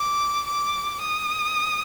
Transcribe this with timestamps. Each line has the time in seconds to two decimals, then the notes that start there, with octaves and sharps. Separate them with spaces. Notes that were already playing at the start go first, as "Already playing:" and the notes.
Already playing: D6
0.47 D6
1.01 D#6